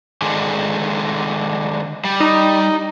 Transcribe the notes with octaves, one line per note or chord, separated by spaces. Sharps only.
D3 D#3 G#3
G3
D#4